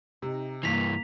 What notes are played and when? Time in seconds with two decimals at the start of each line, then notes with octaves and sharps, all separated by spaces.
0.22 C3 D#4
0.63 G2 E3 A#3 B6 F7